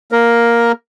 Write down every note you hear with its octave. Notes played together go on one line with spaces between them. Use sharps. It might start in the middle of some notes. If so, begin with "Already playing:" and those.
A#3 A#4